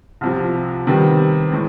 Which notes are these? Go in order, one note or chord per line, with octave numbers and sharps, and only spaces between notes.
C2 C3 F3
C3 D#3 G3 B3
A2 E3 G#3